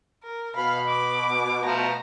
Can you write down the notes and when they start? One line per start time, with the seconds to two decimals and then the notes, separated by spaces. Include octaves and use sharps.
0.23 A#4
0.56 B2 F5 B5
0.88 D6
1.65 F3 A3 A#5